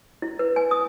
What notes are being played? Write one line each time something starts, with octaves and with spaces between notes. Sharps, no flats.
E4
B4
G#5
D#6